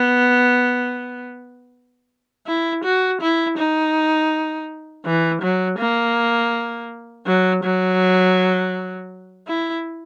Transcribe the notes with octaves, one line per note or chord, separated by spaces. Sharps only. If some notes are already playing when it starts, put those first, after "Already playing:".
Already playing: B3
E4
F#4
E4
D#4
E3
F#3
A#3
F#3
F#3
E4